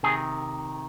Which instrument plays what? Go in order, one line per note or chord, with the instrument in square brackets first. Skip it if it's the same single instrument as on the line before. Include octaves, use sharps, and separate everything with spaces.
[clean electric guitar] C3 D#3 G#4